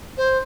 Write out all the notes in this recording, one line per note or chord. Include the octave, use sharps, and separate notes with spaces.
C5